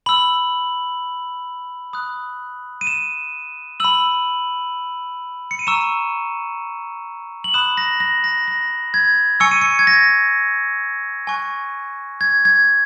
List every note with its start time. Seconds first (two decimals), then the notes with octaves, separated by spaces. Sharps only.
0.06 B5 E6 F#7
1.93 B5 D#6 F#6
2.81 D#7
2.87 E7
3.80 B5 E6 F#7
5.51 C#7
5.59 D#7
5.67 A#5 C#6 E6 E7
7.44 F#7
7.54 B5 D#6 F#6 E7
7.77 A#6
8.00 A#6
8.24 A#6
8.48 A#6
8.94 G#6
9.40 G#5 C#6 E6 C#7
9.51 D#7
9.61 C#7
9.79 G#6
9.87 A#6
11.27 G#5 C#6 F#6
12.21 G#6
12.45 G#6